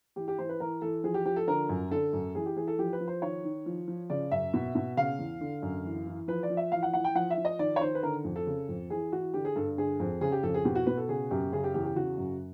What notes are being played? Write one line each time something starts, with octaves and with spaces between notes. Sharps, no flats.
E3 G4
G4
E3 C5
B4
E3 A#4
E3 A4
F3 G#4
G4
F3 G4
A4
D3 A#4
F#2
D3 A4
F#2
E3 G#4
G4
E3 G#4
A4
F3 G4
B4
F3
C5
D#3 C#5
D#3
F3
F3
C#3 D5
F#2 E5
B2
B2
C#3 F5
E2
D3
F#2
E3
E3
F3 B4
D5
F3
E5
E3 F5
F#5
E3 F#5
G5
F3 F#5
E5
F3
D#5
D#3 D5
C#5
D#3 C5
B4
D3 A#4
F2
A4
C#3
F2
E3 G#4
E3 F#4
D3 G4
G#4
G2 A4
D3 G#4
F2
C#3 G#4
G4
F2 A4
G#4
B2 G4
F#4
B2 B4
A4
C#3 G#4
F#2 G4
C#3 G#4
G4
E2 G4
G4
C#3 F#4
F#2